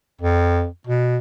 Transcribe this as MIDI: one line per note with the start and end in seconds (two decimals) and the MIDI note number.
0.21 0.66 41
0.87 1.18 47